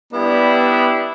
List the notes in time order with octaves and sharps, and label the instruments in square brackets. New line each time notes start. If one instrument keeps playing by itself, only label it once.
[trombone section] G3 D4 E4 [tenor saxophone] B3